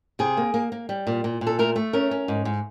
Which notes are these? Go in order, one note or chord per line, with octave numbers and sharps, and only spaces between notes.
C3 G#4
A#3
A#3
A#3
G3
A#2
A#2
A#2
A4
A3 A#4
A3
C#4 A#4
C#4
G#2
G#2